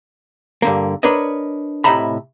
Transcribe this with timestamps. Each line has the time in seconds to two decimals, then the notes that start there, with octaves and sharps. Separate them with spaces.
0.62 G2 D3 A#3
1.03 D4 A#4 B4 C#5 D#5
1.84 A2 C3 D#5 E5 A#5 B5